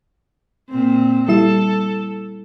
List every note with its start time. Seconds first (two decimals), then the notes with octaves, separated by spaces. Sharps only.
0.69 A#2 C4
1.28 G3 E4 A4 E7